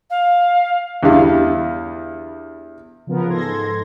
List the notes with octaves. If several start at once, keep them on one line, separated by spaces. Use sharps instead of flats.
F5
E2 D3 G3 E4 F5
C#3 F3 B3 A#4
G#2 A4 C6 G#6 A#6